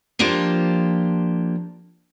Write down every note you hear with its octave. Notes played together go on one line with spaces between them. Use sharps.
F3 A#3 D4 F4 G4 C5